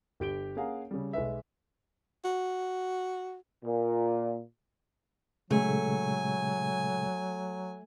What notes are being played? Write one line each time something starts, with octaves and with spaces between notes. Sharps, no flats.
G1 G4 D7 G7
A#3 C#4 G#4 F5 F#5 A#5
C#3 G3
B1 G#3 B4 E5
F#4
A#2
A#2 C#3 F#3 G#3 A3 G#5